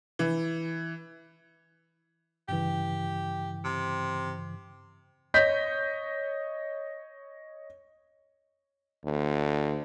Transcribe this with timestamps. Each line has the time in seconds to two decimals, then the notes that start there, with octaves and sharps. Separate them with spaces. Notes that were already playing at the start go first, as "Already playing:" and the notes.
0.19 E3
2.49 G2 C#3 E3 G4
3.65 C3
5.34 C#5 D#5 G6 B6
9.05 D2